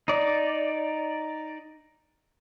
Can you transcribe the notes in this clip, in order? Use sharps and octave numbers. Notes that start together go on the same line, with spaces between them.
D#4 D5